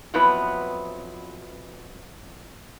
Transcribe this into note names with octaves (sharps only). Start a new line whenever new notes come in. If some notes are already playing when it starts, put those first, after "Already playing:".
F2 F3 F#3 B3 E4 B4